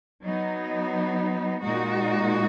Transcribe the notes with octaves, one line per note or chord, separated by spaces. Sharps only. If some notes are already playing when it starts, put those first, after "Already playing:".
F#3 B3 D#4
A#2 G#3 D#4 F#4